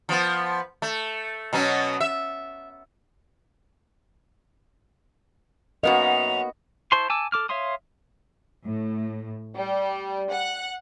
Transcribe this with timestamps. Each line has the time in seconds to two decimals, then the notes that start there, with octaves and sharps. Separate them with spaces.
0.09 F3 B3
0.82 A3
1.53 B2 F#3 C#4
2.01 E5
5.83 F#2 A#3 B3 F#4 D#5 F7
6.92 E4 C5 A5 C6 C#6
7.10 G#5 A5 D6 E6
7.32 A4 D6 F6
7.49 C#5 E5 F5 C6 D#6
8.66 A2
9.55 G3
10.32 F#5